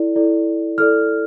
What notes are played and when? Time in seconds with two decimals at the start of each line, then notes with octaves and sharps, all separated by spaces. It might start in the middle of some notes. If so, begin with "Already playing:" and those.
Already playing: E4 A4 D5
0.16 E4 A4 D5
0.78 E4 A4 D5 F6